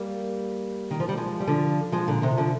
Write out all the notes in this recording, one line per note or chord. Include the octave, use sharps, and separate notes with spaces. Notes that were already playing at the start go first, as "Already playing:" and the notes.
Already playing: G3 A#3
D#3
F3
G3
F3 G#3
G3
D3 F3
F3 G#3
A#2 D3
C3 D#3
D3 F3